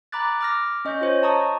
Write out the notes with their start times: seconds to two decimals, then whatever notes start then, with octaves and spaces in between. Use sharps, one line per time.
0.12 A#5 B5 D6 F#6 A6
0.41 D6 F6 A#6
0.85 C#4 D#5 C#6 G6
1.01 F4 C5 C#5
1.22 D#5 A5 A#5 C#6 D#6